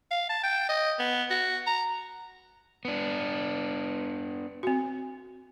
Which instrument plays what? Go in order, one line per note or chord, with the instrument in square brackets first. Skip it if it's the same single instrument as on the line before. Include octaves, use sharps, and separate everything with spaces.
[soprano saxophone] F5
A5
G5
D#5
B3
F#4
A#5
[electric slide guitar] B3 D4
[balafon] C4 F#4